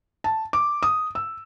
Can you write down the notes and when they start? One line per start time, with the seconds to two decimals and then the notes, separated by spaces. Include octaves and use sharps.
0.24 A5
0.53 D6
0.83 D#6
1.15 E6